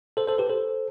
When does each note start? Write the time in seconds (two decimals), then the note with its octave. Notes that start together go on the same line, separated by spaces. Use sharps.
0.17 A4 C5
0.27 A4 C5
0.38 G4 B4
0.50 A4 C5